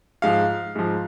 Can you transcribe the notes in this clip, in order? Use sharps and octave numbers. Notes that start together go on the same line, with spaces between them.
G#2 F3 F5
G#2 F3